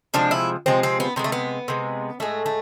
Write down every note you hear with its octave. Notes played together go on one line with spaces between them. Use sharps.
C3 F3 G#3 D4
E4
C3 F3 G#3 C4
C4
B3
C3 G#3 B3
A3
B3
C3 G#3
A2 G#3 A3
A3